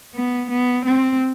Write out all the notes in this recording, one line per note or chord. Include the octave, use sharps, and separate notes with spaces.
B3
B3
C4